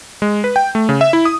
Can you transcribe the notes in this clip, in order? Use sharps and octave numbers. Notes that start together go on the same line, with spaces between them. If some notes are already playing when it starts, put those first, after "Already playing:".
G#3
B4
G5
A3
C#3
E5
E4
D#6